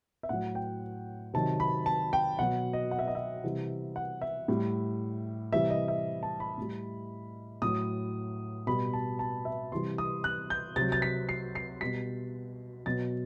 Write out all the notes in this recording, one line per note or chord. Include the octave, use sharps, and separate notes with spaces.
E5
A2 F#3 F#5
G5
C3 D#3 F#3 A5
B5
A5
G5
B2 F#3 F#5
D#5
F#5
E5
D#5
E5
C3 E3 G3
F#5
E5
A2 G3
C3 E3 G3 E5
D#5
E5
A5
B5
A2 G3
A2 F#3 D#6
B2 G3 B5
A5
A5
E5
C3 E3 G3 C6
D#6
F#6
G6
C3 A6
F#3
A6
B6
C7
C7
B2 G3 B6
B2 F#3 A6